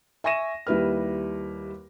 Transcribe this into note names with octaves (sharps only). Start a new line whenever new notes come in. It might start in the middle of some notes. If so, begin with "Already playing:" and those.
E5 G#5 C#6 A#6 D#7 E7
D#2 G3 E4 B4 F6